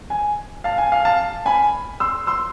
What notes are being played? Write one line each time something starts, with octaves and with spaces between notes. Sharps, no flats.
G#5
F5 A5
G#5
F5
F5 A5
G#5 B5
C6 E6
C6 E6